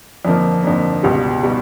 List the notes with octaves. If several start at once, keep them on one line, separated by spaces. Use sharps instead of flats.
F2 D3 F3 A#3
F2 D3 F3 A#3
C#2 B2 G3
B2 G3